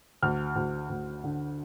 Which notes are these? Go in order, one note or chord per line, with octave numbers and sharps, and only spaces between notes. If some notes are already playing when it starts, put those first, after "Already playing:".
D2 F6
D2
D2
D3